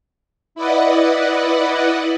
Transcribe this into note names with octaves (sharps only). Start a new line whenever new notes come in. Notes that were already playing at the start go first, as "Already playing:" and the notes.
E4 B4 D5 D#5 F#5